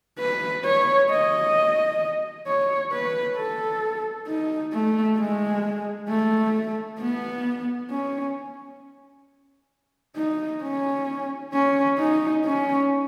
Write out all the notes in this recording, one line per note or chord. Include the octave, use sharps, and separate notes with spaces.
B4
C#5
D#5
C#5
B4
A4
D#4
A3
G#3
A3
B3
C#4
D#4
C#4
C#4
D#4
C#4